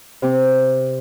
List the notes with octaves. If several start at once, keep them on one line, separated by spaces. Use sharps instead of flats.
C3 C4